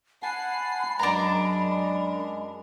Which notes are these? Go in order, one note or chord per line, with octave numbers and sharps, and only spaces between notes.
F#5 G#5 A5 B5 C7
F#2 G#3 D4 A#4 A#5